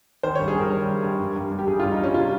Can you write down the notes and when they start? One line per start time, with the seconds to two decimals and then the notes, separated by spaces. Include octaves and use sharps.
0.23 D#3 C5
0.35 G2 C#5
0.48 G#4
0.56 G2 A#4
0.72 D#3
0.87 G2
1.03 G2
1.19 G2
1.36 G2
1.52 G2
1.59 G4
1.67 G2 G#4
1.80 G2 F4
1.92 D#4
1.99 G2 C#4
2.14 C3 F4